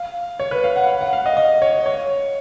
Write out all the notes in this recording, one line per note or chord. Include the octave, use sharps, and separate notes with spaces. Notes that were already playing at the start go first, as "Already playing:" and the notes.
Already playing: F5
C#5
B4
F5
F#5
F5
F#5
F5
D#5
D#5
C#5
C#5